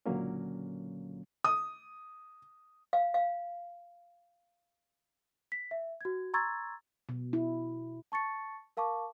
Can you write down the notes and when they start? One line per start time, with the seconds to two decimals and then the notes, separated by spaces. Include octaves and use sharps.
0.06 C#2 A#2 D3 F#3 A#3 C#4
1.44 D#6
2.93 F5
3.14 F5
5.52 B6
5.71 E5
6.01 F#4 G#6
6.34 A#5 C6 C#6 E6 G#6 A6
7.09 B2
7.33 E4
8.12 A5 C#6 A6 C#7
8.77 A#4 F5 A5 C#6 D6